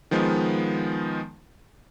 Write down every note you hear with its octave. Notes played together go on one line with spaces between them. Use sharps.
D#3 F3 G#3 B3